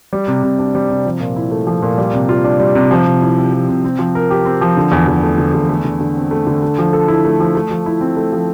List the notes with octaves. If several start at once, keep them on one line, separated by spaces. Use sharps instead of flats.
G3
C3
C3
D4
G3
C3
F3
A#2
E4
A3
F3
A#2
G3
C3
F4
D4
G3
C3
F3
C3
E4
C4
F3
C3
C4
F3
A#4
G4
C4
F3
D3
E2
E2
A3
D3
E2
A3
D3
D3
C4
A3
D3
A3
F3
A4
E4
A3
F3
A3
F3
E4
C4
A3
F3